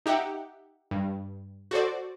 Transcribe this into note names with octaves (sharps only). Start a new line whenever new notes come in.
D#4 G4 E5 F#5
G2
F#4 A4 C5 D5